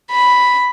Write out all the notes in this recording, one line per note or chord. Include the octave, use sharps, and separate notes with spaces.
B5